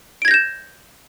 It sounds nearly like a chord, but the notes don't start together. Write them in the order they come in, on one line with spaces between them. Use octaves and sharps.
D7 G#6 A#6 G6 E7